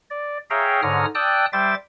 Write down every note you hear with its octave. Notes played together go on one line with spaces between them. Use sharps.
D5
G#4 C#5 E5 F5 G5 A#5
G#2 D3 C#5 A#5 D#6 F6
D5 G5 A5 D#6 E6 F#6
G3 C5 E5 G5 D6 A6